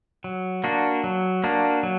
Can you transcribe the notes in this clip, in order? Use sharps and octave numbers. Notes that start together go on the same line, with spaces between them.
F#3
A#3 D4 F#4
F#3
A#3 D4 F#4
F#3